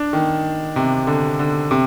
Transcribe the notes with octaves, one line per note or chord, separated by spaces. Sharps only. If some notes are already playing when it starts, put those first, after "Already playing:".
Already playing: D4
D#3
C3
D3
D3
C3